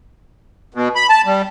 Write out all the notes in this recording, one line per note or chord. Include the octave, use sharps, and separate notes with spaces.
B2
B5
A5
G3